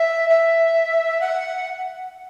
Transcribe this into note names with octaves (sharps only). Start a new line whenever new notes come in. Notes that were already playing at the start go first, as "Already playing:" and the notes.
Already playing: E5
E5
F#5